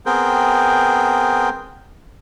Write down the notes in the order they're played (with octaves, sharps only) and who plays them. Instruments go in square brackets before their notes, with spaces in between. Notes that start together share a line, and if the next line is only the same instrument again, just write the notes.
[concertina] B3 C4 G#4 A#4 G5